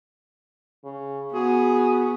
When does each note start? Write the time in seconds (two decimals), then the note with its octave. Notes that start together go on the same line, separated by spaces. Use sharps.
0.84 C#3
1.35 B3 F#4 G#4